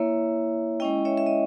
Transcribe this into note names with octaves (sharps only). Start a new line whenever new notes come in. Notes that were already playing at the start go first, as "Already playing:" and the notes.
Already playing: A#3 E4 C#5 E5
G#3 C#4 E4 D#5 G5
C#5 E5
E5
D#5